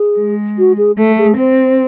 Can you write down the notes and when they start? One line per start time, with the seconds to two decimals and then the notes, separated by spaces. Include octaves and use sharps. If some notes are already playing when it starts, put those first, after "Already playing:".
Already playing: G#4
0.19 G#3
0.59 F#4
0.78 G#4
0.98 A3 A4
1.18 G#4
1.38 C4 C5